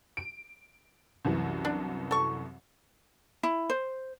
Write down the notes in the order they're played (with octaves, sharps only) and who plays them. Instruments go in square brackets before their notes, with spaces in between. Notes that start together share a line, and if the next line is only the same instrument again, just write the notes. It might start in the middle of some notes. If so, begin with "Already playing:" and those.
[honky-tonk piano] D7
C2 F#2 E3
[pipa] D4
A4 C#6
[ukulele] E4
C5